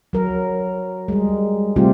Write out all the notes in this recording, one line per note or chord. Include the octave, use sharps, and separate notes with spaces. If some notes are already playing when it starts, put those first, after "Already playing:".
F#3 A#4
G3 G#3
C3 G3 A3 C4 F4 G4